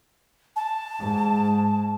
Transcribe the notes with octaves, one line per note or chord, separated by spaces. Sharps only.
A5
G#2